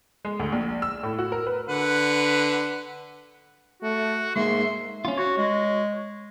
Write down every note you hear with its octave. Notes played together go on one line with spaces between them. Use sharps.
G#3
D2
A#1
E6
A2
F#4
A#4
B4
D3 B4 F#5
A3 F#4
G#2 G#3 A#3 E5 C6
C#4 F4
F#4 C#5
G#3